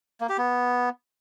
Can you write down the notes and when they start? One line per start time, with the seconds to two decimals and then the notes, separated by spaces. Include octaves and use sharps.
0.21 A#3
0.29 G4
0.38 B3